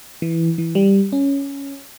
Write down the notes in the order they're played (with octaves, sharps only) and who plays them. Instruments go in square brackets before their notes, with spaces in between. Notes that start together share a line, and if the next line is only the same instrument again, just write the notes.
[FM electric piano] E3
E3
G3
C#4